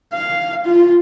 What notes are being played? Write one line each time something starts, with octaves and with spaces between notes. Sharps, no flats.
F5
F4